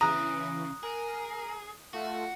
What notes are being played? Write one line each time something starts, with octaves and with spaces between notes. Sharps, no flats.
C#3 E3 A#5 D#6 F#6
G#4 A#4
A3 F4 F#4